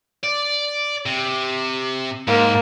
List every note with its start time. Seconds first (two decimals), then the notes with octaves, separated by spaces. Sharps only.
0.24 D5
1.06 C3
2.27 G#2 A#3